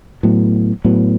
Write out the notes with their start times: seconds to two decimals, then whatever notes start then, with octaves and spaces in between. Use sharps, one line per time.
0.23 A2 F#3 B3
0.85 A2 F#3 B3